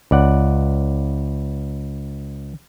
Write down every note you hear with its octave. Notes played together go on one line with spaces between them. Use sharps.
C#2 D5 F#5